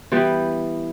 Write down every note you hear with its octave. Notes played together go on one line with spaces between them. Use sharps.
E3 G3 B3 G5